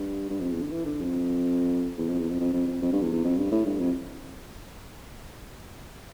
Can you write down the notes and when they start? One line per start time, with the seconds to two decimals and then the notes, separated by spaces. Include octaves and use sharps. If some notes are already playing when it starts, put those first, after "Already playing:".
Already playing: G2
0.30 G2
0.41 F2
0.51 E2
0.61 D3
0.71 E3
0.86 D3
1.00 F2
1.98 E2
2.08 F2
2.19 E2
2.29 F2
2.40 F2
2.53 F2
2.67 F2
2.82 F2
2.92 G2
3.02 E2
3.13 E2
3.24 F2
3.38 G2
3.51 A2
3.66 G2
3.79 F2